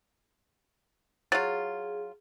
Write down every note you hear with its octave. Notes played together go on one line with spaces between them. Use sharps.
F#3 F4 G#4 A6